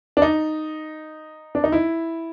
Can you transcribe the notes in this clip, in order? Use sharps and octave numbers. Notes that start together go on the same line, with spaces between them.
D4
D#4
D4
D#4
E4